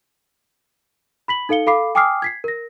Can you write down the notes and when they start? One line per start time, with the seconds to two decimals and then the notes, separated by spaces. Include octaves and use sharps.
1.28 B5 B6 F#7
1.49 D#4 A4 F5 C#7 G7
1.67 A4 F5 B5 D6 C7
1.95 G5 G#5 D6 D#6 F6 C7
2.22 G#6 B6 C7
2.44 A#4 A#6